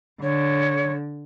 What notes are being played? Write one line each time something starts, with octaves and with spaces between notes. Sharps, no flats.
D3 C#5